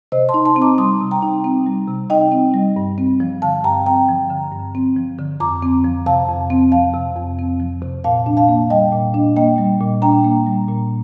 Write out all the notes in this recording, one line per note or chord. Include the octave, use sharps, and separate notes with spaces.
C3 C5 D#5
A5 C6
D#4
A5 C6
C4
A#5 D6
G3 C6 D#6
C3
G5 A#5
D#4
C4
G3
C3
D#4 D#5 G5
C4
G3
G2
C4
F3
D3 F5 A5
G2 G5 A#5
C4 G5 A#5
F3
D3
G2
C4
F3
D3
F2 A#5 D6
C4
F3
C3 F5 A5
F2
C4
F3 F5 A5
C3
F2
C4
F3
C3
A#2 F5 A5
D4
F5 A5
A#3
G3 D#5 G5
A#2
D4
A#3 D#5 G5
G3
A#2
D4 G5 A#5
A#3
G3
A#2